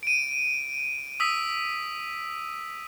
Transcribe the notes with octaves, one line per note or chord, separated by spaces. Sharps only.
D7 D#7
D#6 E6 B6